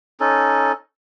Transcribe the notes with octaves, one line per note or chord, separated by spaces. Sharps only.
C#4 D#4 A4